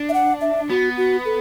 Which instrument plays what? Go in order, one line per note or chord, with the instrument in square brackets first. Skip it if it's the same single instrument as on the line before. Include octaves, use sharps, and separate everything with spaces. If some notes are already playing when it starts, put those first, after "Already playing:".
Already playing: [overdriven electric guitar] D4
[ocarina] E5
F#5
E5
[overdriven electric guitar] B3 [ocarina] F#4
[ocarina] F#4
A4